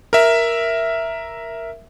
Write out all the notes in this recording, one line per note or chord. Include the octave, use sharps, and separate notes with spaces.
A#4 E5